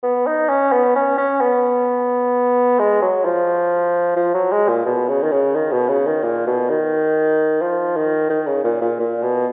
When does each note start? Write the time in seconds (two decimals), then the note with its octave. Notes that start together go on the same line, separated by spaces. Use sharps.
0.03 B3
0.27 D#4
0.49 C#4
0.72 B3
0.95 C#4
1.18 C#4
1.41 B3
2.79 G#3
3.02 F#3
3.25 F3
4.16 F3
4.34 F#3
4.51 G#3
4.68 A#2
4.86 B2
5.09 C#3
5.22 D#3
5.32 C#3
5.55 D#3
5.72 B2
5.88 C#3
6.06 D#3
6.23 A#2
6.47 B2
6.69 D#3
7.61 F3
7.96 D#3
8.30 D#3
8.47 C#3
8.64 A#2
8.81 A#2
9.00 A#2
9.23 B2